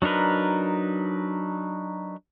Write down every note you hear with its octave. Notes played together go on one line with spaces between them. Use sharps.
F#3 D4 D#4 A#4 B4